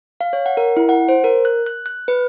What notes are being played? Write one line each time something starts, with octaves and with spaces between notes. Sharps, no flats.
F5
C#5
F#5
A#4
E4
F#5
C5
A#4
F#6
F#6
F#6
B4